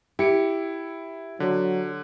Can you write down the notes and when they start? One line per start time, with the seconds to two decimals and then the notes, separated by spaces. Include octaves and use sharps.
0.19 E4 G4 C#7 D7
1.40 D3 F#3